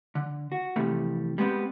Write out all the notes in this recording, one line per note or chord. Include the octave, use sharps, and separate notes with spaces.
D3
F#4
C3 E3 F3 G3 A3
G3 G#3 B3 C4